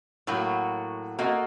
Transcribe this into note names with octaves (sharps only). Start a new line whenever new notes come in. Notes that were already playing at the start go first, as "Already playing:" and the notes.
A2 F#3 A#3 F#4
A#3 F#4 A4 D#5